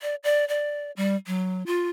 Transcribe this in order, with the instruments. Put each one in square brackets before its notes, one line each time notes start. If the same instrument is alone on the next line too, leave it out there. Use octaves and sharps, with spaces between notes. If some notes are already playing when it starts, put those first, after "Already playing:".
[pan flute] D5
D5
D5
G3
F#3
F4